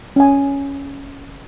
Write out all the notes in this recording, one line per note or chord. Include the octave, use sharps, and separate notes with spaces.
C#4 G#5